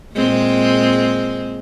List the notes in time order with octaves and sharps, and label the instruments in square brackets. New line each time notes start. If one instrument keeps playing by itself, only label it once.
[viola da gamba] A#2 G#3 C4